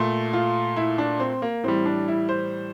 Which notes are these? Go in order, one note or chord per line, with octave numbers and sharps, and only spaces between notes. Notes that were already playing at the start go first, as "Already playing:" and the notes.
Already playing: A#2 A3
F4
E4
D4
C4
A#3
A2 E3 G3 C4
D4
E4
C5